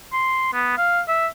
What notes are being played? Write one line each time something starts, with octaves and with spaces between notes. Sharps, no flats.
C6
B3
F5
E5